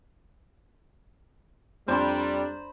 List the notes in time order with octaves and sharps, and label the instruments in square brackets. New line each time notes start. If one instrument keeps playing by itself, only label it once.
[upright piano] F2 [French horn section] G3 [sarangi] D4 [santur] C5 A#5 B5